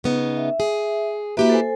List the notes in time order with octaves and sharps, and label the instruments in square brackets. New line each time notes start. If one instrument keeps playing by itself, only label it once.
[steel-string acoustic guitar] C#3 B3 D#4
[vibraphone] E5
[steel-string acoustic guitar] G#4
[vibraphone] A#3 F#4 E5 [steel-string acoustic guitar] E4 G4 B4
[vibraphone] A4 C5 G#5